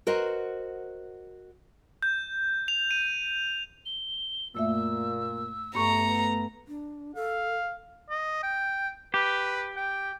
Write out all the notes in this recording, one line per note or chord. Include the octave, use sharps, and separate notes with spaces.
F#4 A#4 C5 D#5 F#5
G6
F7
D#7
G7
F#2 A#2 A3 A#3 E5 E6
G2 A3 B3 A#5 C#6 C#7
D4
A4 F5
D#5
G5
G4 B4
G5